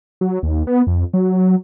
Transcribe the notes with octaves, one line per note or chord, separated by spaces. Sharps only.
F#3
D#2
B3
F2
F#3